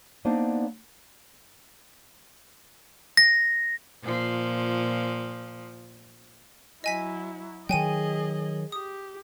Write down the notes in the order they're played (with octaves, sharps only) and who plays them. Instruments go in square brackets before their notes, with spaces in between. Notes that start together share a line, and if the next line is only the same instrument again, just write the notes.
[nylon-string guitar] A#3 B3 D4 D#4 C5 D5
[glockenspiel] A#6
[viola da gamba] A#2 F3
[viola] F#3 E4 [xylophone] D#5 G#5 B6
[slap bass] D#3 F#3 [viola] G#4 D#5 [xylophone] G5 G#5 D#7
[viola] G4 [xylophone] D#6